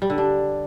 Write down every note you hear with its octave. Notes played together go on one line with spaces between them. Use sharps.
G3
D3
D4